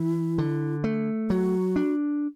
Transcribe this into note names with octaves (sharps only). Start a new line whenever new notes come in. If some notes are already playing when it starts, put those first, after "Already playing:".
Already playing: E3 E4
D3
A3
F#3 F#4
D4